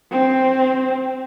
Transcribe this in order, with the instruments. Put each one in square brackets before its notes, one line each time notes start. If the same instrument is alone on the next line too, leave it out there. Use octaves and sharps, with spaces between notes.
[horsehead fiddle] C4